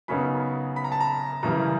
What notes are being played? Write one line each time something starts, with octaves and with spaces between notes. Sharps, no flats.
F#2 C#3 F#3 B3 D#4 B5
B5
A#5
A5
A#5
F#2 C#3 E3 G3 A#5